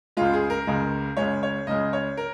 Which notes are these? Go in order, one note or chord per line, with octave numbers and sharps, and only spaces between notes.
C#2 C#3 G#3 F4
G#4
A#4
C#2 C#3 G#3
C#2 C#3 G#3 C#5
C#5
C#2 C#3 G#3 D#5
C#5
A#4